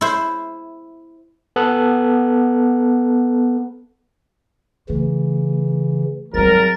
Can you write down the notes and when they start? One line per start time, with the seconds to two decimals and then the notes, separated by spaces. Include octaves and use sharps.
0.01 E4 C5
1.56 B3 A4 F#6
4.89 C#3 E3 A3
6.34 G#1 F#3 G3 A#4 A6